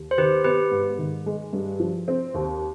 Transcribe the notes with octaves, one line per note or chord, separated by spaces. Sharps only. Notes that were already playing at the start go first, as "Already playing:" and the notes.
Already playing: D#2
C5
D#3 G4 B4
B3 G4 B4
G#2
D#3
G#3
G2
F3
C4
D#2